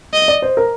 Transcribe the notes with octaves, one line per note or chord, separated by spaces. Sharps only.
D#5
D5
C5
A#4